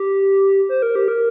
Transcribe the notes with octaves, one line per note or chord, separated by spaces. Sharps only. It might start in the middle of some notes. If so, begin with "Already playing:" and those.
Already playing: G4
C5
A#4
G4
A#4